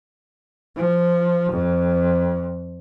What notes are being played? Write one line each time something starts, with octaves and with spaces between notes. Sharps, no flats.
F3
F2